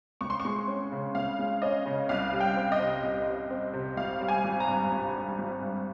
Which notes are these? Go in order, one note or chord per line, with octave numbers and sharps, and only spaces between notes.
C#2 C#6
C6
C#6
G#3
C#4
C#3
C#2 F5
G#3
C#4 D#5
C#3
C2 F5
G3
G5
C4
D#5
C3
C2
G3
C4
C3
G#1 F5
G3
G#5
G#1
A#5
G2
G#1
G3
G#1
G2